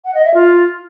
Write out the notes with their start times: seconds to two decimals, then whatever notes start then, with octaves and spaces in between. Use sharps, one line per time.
0.05 F#5
0.15 D#5
0.24 E5
0.34 F4